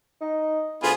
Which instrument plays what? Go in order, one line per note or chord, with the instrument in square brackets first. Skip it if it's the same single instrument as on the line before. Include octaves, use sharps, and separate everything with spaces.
[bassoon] D#4
[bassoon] D2 [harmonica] B3 F4 G#4